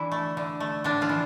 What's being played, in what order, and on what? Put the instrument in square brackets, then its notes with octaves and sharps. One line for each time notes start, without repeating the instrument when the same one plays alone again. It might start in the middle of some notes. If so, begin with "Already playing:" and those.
Already playing: [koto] D3 E3 E4
A3
D3
A3
A2 D3 D4
F3 F4
E3